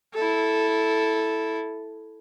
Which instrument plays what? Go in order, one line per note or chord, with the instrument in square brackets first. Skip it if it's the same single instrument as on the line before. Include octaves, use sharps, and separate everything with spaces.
[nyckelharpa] E4 A4